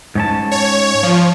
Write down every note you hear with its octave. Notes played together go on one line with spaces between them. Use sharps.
G#2 C#4 A5
C#5
F3